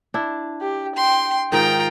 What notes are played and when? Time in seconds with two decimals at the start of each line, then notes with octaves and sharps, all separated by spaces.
0.14 D4 E4
0.61 G4
0.96 G5 C6
1.52 G#2 D#3 D#4 F4 G5 A#5